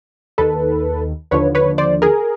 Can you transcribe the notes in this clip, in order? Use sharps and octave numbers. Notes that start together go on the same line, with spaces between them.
D#2 D#3 A4 B4
D#2 D3 F3 B4 C#5
B4 C#5
C5 D5
G#4 A#4